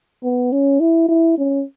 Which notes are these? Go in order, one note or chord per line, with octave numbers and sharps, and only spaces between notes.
B3
C#4
E4
E4
C#4